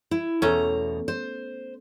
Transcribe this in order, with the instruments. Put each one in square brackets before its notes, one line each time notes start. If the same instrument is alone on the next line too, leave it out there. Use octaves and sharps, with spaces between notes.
[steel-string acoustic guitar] E4
[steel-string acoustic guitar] E2 B2 A#5 [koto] A3 C#4
[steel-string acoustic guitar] C5